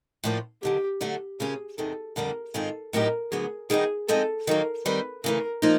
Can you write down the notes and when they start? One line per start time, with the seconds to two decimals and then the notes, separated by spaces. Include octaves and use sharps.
0.24 A2 F3 A#3 D4
0.63 D#2 D3 F#3 G4
1.01 D3 F#3 A3 D4
1.39 C#3 F3 A#3 C#4 G#4
1.78 E2 C3 D#3 A4
2.16 F2 D3 G3 A#3 D4 A#4
2.54 G#2 D#3 G#3 C4 F4 A4
2.93 A2 F#3 B3 D#4 G4 A#4
3.31 D2 D3 F#3 B3 G#4
3.70 D#3 G3 B3 D#4 G#4
4.08 F3 G#3 C4 D#4 A4
4.47 D#3 F#3 A#3 A#4
4.85 D#3 G3 C4 B4
5.24 C#3 E3 A3 A#4
5.62 F3 A#3 D#4